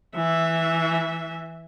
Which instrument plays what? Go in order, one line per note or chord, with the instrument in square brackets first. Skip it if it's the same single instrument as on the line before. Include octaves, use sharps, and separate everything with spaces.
[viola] E3 E5